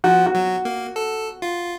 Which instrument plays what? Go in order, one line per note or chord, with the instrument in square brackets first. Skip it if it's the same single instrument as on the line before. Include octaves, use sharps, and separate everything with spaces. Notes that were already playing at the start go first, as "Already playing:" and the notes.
[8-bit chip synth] F3 [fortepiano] F#4
[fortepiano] F#4
[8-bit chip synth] F#3
A#3
A4
F4